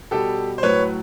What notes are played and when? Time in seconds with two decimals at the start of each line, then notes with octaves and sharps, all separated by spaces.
0.11 B2 G3 G4 A4
0.58 C5
0.63 A2 F#3 B4 C#5